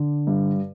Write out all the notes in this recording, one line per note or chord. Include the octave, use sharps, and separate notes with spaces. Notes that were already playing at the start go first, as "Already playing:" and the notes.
Already playing: D3
G2